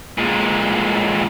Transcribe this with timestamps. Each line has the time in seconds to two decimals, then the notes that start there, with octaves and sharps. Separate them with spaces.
0.18 A#2 G#3